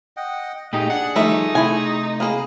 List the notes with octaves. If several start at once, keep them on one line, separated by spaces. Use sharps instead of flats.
D#5 F#5 G5
A#2 A3 D#4 G4 G#4
D4 F#5
D#3 F3 G3 A3 D#4 E5
C3 A3 E4 G#5
A#3 G#4 B5 D#6